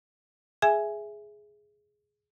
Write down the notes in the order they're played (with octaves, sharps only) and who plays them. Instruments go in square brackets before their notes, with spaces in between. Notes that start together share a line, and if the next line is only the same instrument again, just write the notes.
[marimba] G#4 E5 G#5